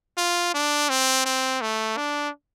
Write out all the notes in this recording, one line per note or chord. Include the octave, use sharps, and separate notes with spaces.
F4
D4
C4
C4
A3
D4